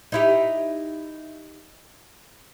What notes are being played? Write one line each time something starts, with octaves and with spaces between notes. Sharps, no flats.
D#4 E4 G4